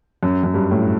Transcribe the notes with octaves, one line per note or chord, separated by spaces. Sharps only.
F#2
F#2
G2
A2